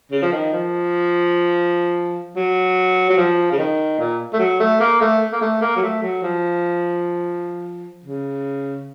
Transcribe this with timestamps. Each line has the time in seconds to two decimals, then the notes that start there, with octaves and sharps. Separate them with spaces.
0.12 C#3
0.22 F3
0.33 D#3
0.53 F3
2.36 F#3
3.10 F#3
3.17 F3
3.52 C#3
3.59 D#3
3.99 A#2
4.33 A3
4.39 F#3
4.60 A3
4.80 A#3
5.01 A3
5.32 A#3
5.42 A3
5.61 A#3
5.77 F#3
5.83 A3
6.02 F#3
6.23 F3
8.06 C#3